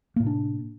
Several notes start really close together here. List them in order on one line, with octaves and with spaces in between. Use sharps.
A#3 A2 C3 D4